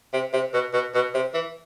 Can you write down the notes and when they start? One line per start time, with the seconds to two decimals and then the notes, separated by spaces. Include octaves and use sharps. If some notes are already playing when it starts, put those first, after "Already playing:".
0.13 C3
0.33 C3
0.53 B2
0.73 B2
0.94 B2
1.14 C3
1.34 E3